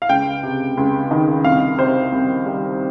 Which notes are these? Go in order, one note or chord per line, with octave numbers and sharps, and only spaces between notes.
F5
C#2 G5
C3
C#2
D#3
C2 F5
C3 C5
C2
G3